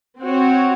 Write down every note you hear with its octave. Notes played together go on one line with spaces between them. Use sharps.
C4 F#4 C#5